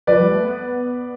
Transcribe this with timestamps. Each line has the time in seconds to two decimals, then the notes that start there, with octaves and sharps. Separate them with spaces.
0.07 F3 B4 D5
0.20 G3
0.32 A3
0.44 B3